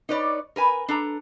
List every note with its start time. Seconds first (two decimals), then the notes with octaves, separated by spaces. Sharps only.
0.09 D#4 B4 C#5 D5
0.56 A#4 B4 G#5
0.88 D4 A4 A#5